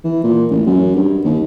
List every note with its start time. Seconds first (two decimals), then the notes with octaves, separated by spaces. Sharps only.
0.04 E3
0.24 A#2
0.51 A1
0.66 F#2
0.96 G2
1.25 D#2